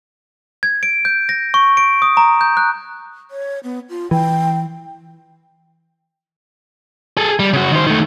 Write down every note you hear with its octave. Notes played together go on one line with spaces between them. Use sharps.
G#6
D7
G6
A#6
C#6
D7
D#6
A#5
G6
F#6
C#5
B3
F4
E3 G5
G#4 A4
G3
C#3 F#4
D#3 C5
D#3 A3